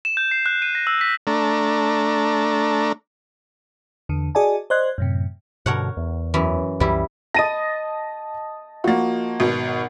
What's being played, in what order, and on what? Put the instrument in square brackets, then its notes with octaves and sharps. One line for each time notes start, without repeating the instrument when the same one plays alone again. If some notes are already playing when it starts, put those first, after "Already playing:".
[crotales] E7
G6
C7
F#6
D#7
A#6
E6
B6
[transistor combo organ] A3 D4 A#5
[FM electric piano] E2 D3
F#4 G#4 D5 D#5 G#5 A5
C5 D5 D#5 C6 F#6 G#6
F#2 A2 C3
[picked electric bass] G2 B2 D3 [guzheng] A#4 C#5 F#5
[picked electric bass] E2
[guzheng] F#2 E3
[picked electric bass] C2 F#2 E3 [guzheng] G3 E4
[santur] D#5 A5 [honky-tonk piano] A#6 D#7
[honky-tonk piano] F3 A#3 [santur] F#4
[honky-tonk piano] G#1 B2